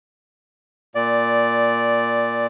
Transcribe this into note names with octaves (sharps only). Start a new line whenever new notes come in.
A#2 D5